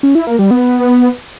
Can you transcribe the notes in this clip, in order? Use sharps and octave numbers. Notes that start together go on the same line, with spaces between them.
C#4
E4
A#3
G3
B3